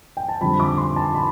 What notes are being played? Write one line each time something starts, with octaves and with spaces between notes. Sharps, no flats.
G5
A5
F2 D3 G3 B5
D6
C6
A5
B5